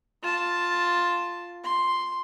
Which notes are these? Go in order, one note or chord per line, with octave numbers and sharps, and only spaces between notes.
F4 A5
C6